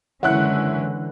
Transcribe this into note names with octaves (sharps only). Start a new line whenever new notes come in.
F#1 D3 E3 G#3 C#4 E4 F#5 F#6